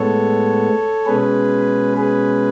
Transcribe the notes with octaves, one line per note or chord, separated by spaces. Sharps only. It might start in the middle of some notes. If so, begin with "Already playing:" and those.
Already playing: A2 G#3 B3 A4 C#5
B2 G#3 C#4 G#4 B4
G#4 B4